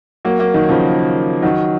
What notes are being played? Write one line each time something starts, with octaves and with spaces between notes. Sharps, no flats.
F#3 A#3
F#3 A#3
D#3 F#3
C#3 F3
D#3 F#3